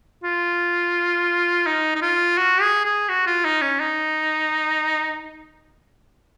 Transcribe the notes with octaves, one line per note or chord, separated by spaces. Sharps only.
F4
D#4
D#4
F4
F#4
G#4
G#4
F#4
F4
D#4
C#4
D#4